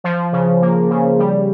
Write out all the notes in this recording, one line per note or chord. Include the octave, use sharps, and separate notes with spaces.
F3
C#3
A#3
C#3
G3